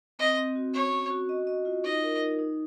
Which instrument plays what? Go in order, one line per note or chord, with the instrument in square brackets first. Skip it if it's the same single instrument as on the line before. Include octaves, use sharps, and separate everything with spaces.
[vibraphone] C4 [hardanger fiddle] D#5
[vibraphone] C4
F#4
[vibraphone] C#4 [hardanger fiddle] C#5
[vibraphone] C#4
F#4
D#5
D#5
F4
[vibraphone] D#4 [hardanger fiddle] D#5
[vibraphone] A#4
D#4
D#4